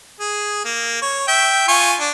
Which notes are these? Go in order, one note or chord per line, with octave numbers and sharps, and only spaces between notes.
G#4
A#3
C#5
E5 G5
F4 G#5 C#6
D4